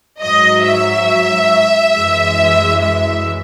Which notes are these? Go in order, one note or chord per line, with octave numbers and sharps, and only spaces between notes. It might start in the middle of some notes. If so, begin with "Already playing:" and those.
G#2 F#3 D#5
E5
F#2 E3 G#3
E5